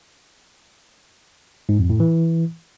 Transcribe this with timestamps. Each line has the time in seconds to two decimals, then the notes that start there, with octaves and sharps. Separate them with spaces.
1.69 G#2
1.79 F2
1.90 A2
2.00 E3